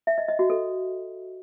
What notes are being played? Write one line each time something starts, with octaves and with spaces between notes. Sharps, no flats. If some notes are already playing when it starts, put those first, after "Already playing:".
E5
D#5
D#5
F#4
A4